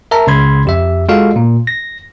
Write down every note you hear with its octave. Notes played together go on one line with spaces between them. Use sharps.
A#4 E5 A5 A#5
C#2 C#3 B5 C6 G#6
F2 G4 E5
G#3 F4 F#4 A4 F5
A#2
A#6